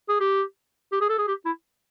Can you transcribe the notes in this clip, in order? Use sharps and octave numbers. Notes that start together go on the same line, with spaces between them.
G#4
G4
G4
G#4
A4
G#4
G4
E4